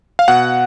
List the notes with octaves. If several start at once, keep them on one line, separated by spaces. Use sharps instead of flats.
F5
B2 F#5